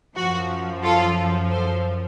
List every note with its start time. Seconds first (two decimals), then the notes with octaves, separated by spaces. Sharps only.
0.15 F#2 F3 F#4
0.83 F4 A4
1.50 A4 C5